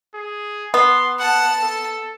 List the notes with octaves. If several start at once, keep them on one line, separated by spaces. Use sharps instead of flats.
G#4
B3 C6
F#5 A5
A4